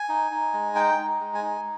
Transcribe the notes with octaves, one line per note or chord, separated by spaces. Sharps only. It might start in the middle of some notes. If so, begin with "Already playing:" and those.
Already playing: G#5
D#4
D#4
G#3
D#4 G5
D#4
G#3
G#5
D#4